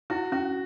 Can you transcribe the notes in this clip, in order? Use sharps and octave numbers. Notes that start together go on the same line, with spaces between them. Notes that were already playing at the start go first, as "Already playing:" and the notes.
E4 F#4
C#4 F#4